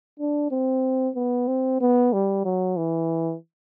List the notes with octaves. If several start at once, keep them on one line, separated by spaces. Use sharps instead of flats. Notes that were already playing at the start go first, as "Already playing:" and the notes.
D4
C4
B3
C4
B3
G3
F#3
E3